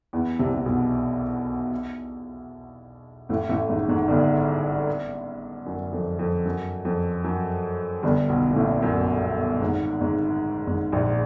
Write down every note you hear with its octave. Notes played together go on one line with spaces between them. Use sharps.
E2 E3
C2 C3
C3
B1 B2
A1 A2
A1 A2
G#1 G#2
G#1 G#2
G1 G2
F#2
F2
F2
F#2
F2
F#2
G1 G2
B1 B2
A#2
A1 A2
F#2
G#1 G#2
G#1 G#2
G#1 G#2
A#1 A#2